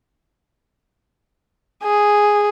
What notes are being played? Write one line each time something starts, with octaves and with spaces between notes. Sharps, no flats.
G#4